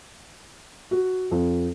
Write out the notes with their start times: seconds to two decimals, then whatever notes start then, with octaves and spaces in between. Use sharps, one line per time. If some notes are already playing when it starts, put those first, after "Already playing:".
0.91 F#4
1.31 F2